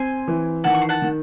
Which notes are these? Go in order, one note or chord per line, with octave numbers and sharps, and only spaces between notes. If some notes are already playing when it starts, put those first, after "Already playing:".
Already playing: C4 G#5 C6
E3
D#3 F#5 A5
C#6
C6
F#5 A5
D#3